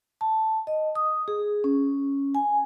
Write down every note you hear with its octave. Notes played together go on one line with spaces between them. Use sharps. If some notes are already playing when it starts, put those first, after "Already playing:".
A5
D#5
D#6
G#4
C#4
G#5